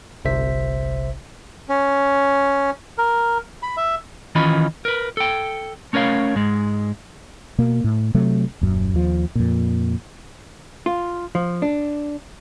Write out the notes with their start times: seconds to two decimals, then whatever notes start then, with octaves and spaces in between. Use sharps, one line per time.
0.25 G1 C2 C3 C5 E5 B6
1.69 C#4
2.98 A#4
3.63 B5
3.77 E5
4.35 D#3 E3 C#4 F4 D#5 B5
4.85 A#4 B4
5.17 A4 G5
5.93 A3 C#4 A#4 C#5 F5
6.35 G#2 G#3
7.58 B2 A#3
7.84 A2
8.14 C3 F#3 A3
8.61 D#1 F#2
8.94 D#2 F3
9.35 F2 A#2
10.86 F4
11.35 F3
11.62 D4